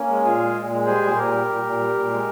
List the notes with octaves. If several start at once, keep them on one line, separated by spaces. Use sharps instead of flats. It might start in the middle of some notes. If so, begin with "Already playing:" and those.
Already playing: A#3 C#4
G#3
A#2 F4 G#4
G#3
A#2
G#3
G3 G#4 C5
A#2
C5
A#2 G4 A#4
G3
A#2
A#2
G3
A#2
G#3